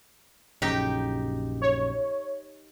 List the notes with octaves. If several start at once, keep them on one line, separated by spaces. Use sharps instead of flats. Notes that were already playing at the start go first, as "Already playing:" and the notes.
A#1 F#2 C#3 D#4 G4 G5
C#5